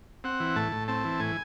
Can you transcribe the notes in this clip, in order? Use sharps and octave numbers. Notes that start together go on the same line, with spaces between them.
C4 F#5
E3
A2 A5
A2
C4 A5
E3
A2 G#5